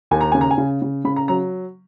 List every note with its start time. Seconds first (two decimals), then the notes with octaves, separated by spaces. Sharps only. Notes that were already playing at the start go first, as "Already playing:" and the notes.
0.11 D#2 G#5
0.21 A#5
0.32 C#3 G#5
0.41 A#5
0.51 G#5
0.58 C#3
0.82 C#3
1.05 C#3 B5
1.16 A#5
1.28 F#3 A#5